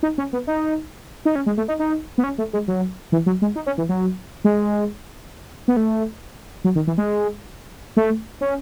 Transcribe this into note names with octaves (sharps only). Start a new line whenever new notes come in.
D#4
C#4
B3
D#4
D#4
C#4
G#3
A3
D#4
D#4
B3
C#4
A3
G#3
F#3
E3
F#3
G#3
D#4
C#4
E3
F#3
G#3
B3
A3
F#3
D#3
E3
G#3
A3
C#4